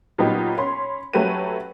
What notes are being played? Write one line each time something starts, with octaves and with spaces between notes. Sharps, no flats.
A#2 F#3 B3 D#4 G4
C#4 B5 C6
F#3 A3 C#4 G4 B4 D#7